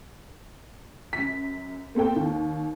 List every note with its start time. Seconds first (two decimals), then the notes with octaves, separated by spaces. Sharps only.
1.13 F#2 B6
1.95 A#3 C4 A4 G5
2.16 D#2